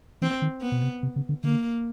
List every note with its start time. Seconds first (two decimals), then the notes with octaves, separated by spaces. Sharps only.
0.22 E3 C4
0.42 D#3
0.62 B3
0.72 B2
0.83 C3
1.03 C3
1.16 C#3
1.29 D3
1.43 D3 A#3